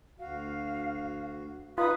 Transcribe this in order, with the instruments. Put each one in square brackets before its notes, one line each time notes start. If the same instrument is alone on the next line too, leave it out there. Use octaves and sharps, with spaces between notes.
[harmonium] D2 F#4 [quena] F5
[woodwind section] D#4 B4 [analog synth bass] F4 [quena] D#6